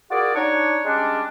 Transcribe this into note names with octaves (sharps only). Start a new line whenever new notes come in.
F4 F#4 G#4 A#4 D5
D4 D#4 C#5
G3 G#3 C#4 D4